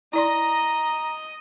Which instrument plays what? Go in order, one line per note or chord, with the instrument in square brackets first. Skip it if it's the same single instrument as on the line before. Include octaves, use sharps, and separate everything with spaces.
[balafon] E4 D5 C6 [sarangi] D#5 [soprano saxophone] A#5